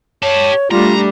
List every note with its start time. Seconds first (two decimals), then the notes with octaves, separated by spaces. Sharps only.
0.23 G4 C#5 A5
0.71 G3 A3 D4 F4 A#5